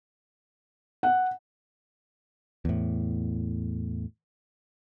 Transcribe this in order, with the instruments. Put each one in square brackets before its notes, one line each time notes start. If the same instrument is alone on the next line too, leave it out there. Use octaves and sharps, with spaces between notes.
[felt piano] F#5
[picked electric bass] E2 A2